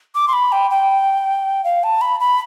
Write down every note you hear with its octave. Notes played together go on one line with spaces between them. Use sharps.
D6
C6
B5
G5
G5
F5
A5
B5
B5